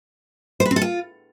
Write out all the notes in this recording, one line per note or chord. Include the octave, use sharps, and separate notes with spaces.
C5
B4
C4
A4
F4